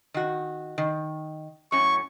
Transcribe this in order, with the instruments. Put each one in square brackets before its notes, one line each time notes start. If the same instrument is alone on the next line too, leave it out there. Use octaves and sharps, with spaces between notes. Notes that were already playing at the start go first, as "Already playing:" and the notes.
[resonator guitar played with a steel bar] D#3 F#4
D#3
[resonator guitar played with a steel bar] F#2 A2 C#4 [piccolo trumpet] C#6